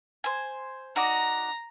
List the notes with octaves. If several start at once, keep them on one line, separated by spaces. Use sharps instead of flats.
C5 G#5
D#4 F#4 D5 A#5